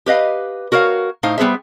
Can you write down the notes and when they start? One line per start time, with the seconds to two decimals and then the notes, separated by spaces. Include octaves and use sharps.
0.06 G4 B4 D#5 F5
0.72 F#4 A#4 C#5 D#5 F5
1.23 A2 D#4 C5 F5
1.38 G3 B3 G#4 C5 E5